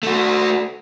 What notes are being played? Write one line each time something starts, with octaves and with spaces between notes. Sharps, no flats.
A3 F#4